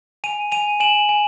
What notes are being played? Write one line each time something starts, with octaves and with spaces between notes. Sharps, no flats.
G#5 D#7 F7
G#5 D#7 F7
G#5 E7 F#7
G#5